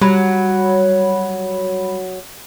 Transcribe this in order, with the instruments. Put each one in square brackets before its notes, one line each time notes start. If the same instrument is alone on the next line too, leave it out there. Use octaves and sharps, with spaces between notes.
[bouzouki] F#3 [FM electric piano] G3 B5